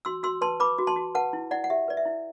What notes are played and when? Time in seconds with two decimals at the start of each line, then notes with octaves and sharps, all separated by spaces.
0.05 F#4 C6 E6
0.23 F#4 C6 E6
0.41 B4 A5 C6
0.60 B4 B5 D6
0.78 F#4
0.87 A5 C6
0.96 F#4
1.15 B4 F#5 A5
1.33 E4
1.51 E4 D5 F#5
1.64 F#5
1.70 G4 E5
1.88 B4 D5
1.97 E5
2.06 E4